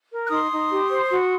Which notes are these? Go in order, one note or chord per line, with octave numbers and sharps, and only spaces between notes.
A#4
F#6
D#4 C6 D#6
D#4
G4
C5
F#4